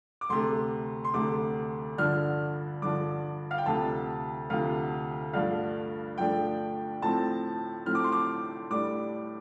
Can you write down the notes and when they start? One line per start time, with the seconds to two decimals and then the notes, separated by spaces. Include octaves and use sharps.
0.21 D6
0.29 D2 C3 A3 C6
1.04 C6
1.14 D2 C3 A3 D6
1.98 G2 D3 F3 D4 F6
2.82 G2 D3 F3 D4 D6
3.51 F5
3.58 G5
3.66 D2 C3 F3 A5
4.50 D2 C3 F3 F5
5.33 G2 F3 A3 D4 F5
6.18 G2 F3 A3 D4 G5
7.02 A2 F3 C4 A5
7.86 A2 F3 C4 F6
7.95 D6
8.04 C6
8.12 D6
8.70 A2 G3 D4 D6